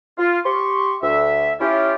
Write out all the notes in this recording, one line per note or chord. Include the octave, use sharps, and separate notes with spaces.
F4
G4 C6 C#6
D2 E5
C#4 E4 F4 G4